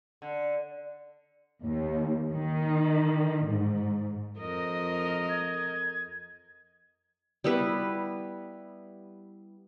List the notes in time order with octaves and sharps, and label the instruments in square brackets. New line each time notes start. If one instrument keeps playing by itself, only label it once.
[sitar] D3
[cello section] D#2
D#3
G#2
[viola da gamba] F2 A#4 D#5
[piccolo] G#6
[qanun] G3 B3 E4 B4